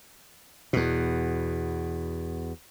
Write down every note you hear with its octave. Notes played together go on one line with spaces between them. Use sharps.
E2 B2